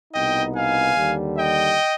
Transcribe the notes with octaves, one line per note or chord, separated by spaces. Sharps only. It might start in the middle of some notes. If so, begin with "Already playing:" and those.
C2 B2 B3 D#4 D#5 G5
F5 G#5
D#2 D3 G3
D#5 G5